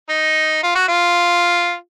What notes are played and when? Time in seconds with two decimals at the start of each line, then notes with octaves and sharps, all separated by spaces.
0.09 D#4
0.63 F4
0.75 F#4
0.88 F4